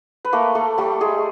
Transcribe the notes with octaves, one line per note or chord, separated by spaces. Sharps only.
B4
A3 A#3 A#4
A3 A4
G3 A3 G4
G#3 G#4